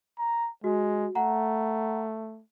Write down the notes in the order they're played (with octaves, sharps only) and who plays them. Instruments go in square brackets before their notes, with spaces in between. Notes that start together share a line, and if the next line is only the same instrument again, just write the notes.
[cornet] A#5
[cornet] G#3 [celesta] F#4
[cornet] A3 [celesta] F#5 A#5